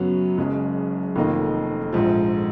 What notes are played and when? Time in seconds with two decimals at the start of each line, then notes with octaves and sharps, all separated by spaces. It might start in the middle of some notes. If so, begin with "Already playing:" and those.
Already playing: F#2 C#3 F#3 B3
0.38 F#1 F#2 C#3 G#3
1.16 F1 F2 D#3 A#3 D#4
1.93 A#1 G#2 F3